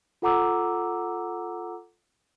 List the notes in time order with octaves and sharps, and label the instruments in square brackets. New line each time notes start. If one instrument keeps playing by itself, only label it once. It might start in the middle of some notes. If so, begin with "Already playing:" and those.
[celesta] F4 A4 F#5 A#5 D6 E6